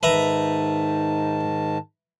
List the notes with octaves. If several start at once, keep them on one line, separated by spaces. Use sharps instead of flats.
G#2 D#3 B4 E5 A5 A#5